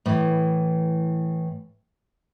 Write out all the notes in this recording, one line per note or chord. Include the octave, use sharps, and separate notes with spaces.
A2 E3